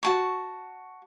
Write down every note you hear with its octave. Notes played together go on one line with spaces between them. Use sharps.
F#4 A5 C#6